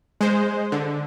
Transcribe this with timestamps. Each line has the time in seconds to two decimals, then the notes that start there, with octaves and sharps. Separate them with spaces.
0.21 G#3 C5
0.72 D3